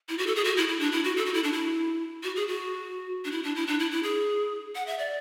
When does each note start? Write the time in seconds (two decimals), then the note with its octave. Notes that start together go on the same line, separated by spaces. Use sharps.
0.09 E4
0.18 F#4
0.27 A4
0.36 G#4
0.44 F#4
0.57 E4
0.68 E4
0.80 D4
0.92 E4
1.04 F#4
1.17 A4
1.26 F#4
1.34 E4
1.44 D4
1.52 E4
2.23 F#4
2.36 G#4
2.48 F#4
3.25 D4
3.32 E4
3.44 D4
3.56 E4
3.67 D4
3.79 E4
3.91 E4
4.03 G#4
4.75 F#5
4.87 E5
4.99 D5